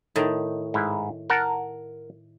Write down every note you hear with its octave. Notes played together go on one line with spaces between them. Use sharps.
A2 D#3
G#2 E4
A#4 F#5 A5